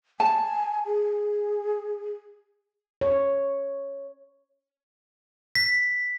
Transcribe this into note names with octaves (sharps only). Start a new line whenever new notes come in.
G#5 A5
G#4
C#5
B6